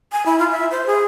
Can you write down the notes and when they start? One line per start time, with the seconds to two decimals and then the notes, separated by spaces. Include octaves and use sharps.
0.12 G#5
0.26 E4
0.39 F4
0.51 E5
0.71 C5
0.87 G#4